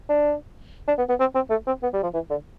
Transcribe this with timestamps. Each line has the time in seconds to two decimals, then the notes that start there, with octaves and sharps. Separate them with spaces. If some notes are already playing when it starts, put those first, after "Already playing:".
0.09 D4
0.88 D4
0.98 B3
1.09 B3
1.20 C4
1.35 C4
1.50 A3
1.67 C4
1.83 B3
1.93 G3
2.03 F3
2.14 E3
2.30 D3